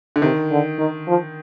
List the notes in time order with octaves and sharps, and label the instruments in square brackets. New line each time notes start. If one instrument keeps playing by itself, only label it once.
[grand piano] D3
[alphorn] C3 [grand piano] D#3
[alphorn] D3
D#3
F3